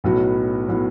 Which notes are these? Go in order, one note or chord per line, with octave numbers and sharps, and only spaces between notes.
B1 A2 F#3 B3 F#4
A2 F#3 B3 F#4